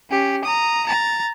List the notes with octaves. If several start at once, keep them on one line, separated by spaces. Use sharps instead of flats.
C#4 G4
A#5 D#6
A#5 A6